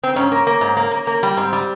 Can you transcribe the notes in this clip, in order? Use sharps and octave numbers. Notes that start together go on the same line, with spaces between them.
C4
G#2 C#4
A#3
A#3
G#2
A#3
A#3
A#3
G3
G#2 C4
G3